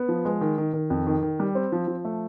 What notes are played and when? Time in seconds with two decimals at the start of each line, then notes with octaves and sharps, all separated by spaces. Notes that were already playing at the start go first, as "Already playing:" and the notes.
Already playing: B3
0.09 F3
0.25 G#3
0.41 D#3
0.58 D#3
0.73 D#3
0.90 F2
1.07 D#3
1.23 D#3
1.40 G3
1.55 C4
1.72 F3
1.88 F3
2.05 A3